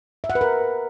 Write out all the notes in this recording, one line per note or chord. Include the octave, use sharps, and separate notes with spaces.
E5
F#5
B4
A#4